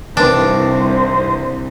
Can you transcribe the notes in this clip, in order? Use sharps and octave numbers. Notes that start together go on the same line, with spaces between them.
C2 G2 D#3 E3 D4 C5